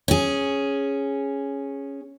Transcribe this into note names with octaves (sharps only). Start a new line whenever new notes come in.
C#4 G#4